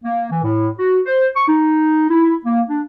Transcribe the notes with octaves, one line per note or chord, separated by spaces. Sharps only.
A#3
E3
A2
F#4
C5
C#6
D#4
E4
A#3
D4